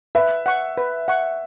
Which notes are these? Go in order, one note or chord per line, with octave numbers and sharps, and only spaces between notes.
B4 E5
F#5 C#6
B4
F#5 C#6